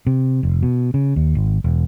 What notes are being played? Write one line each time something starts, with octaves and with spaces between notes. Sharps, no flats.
C3
F1
B2
C#3
D#2
G#1
E1